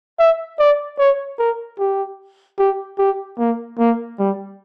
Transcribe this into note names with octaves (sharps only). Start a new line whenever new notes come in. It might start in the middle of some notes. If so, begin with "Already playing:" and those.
E5
D5
C#5
A#4
G4
G4
G4
A#3
A#3
G3